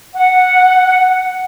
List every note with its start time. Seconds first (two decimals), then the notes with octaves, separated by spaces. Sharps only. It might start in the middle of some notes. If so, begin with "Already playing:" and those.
0.14 F#5